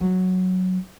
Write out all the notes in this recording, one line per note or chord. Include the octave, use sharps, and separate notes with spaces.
F#3